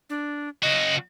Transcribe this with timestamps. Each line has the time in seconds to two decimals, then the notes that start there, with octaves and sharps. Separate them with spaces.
0.10 D4
0.63 C#3 F#4 D#5